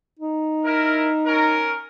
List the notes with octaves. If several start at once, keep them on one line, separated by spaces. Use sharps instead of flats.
D#4
E4 A#4
C#4 A#4